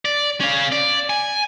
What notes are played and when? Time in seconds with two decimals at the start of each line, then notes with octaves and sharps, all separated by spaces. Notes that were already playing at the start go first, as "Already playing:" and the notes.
0.05 D5
0.41 C#4 F5
0.72 D5
1.10 G#5